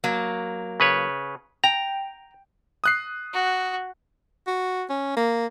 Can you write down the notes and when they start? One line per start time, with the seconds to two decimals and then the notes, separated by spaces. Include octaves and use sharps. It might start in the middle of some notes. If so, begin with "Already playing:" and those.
0.04 F#3 A#3
0.80 C#3 B4 C#5
1.64 G5 A#5
2.84 D#6 F#6 C7
3.33 F#4
4.47 F#4
4.90 C#4
5.17 A#3